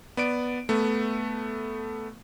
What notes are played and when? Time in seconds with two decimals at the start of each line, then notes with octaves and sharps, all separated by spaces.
0.17 B3 D5 D7
0.69 A3 B3